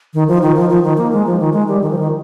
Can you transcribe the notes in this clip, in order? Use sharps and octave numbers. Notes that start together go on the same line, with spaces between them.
D#3
F3
D#3
F3
F3
D#3
A#3
G#3
F3
D#3
G#3
G3
D#3
F3
D#3